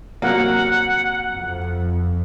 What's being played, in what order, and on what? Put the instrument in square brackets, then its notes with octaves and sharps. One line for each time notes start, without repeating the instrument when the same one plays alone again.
[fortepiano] C3 F#3 A#3 [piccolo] F#5
[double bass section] F2